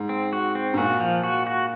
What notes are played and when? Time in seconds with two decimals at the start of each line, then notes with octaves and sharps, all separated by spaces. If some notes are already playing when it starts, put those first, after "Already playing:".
Already playing: G#2
0.09 C4
0.33 F#4
0.55 C4
0.74 G#2
0.78 A#2 F#4
1.00 F3
1.24 F#4
1.47 F#4